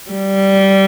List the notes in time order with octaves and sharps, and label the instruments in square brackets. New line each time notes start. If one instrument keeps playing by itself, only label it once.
[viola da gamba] G3